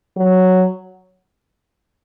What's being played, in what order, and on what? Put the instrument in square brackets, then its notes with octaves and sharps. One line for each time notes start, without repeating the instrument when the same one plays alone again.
[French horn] F#3